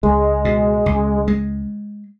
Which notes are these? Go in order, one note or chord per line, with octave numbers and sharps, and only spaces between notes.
C#2 G#3
B2
C#2
G#3